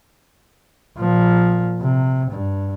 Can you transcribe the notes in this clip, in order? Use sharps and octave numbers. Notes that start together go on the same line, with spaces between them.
A#2 F3
C3
G2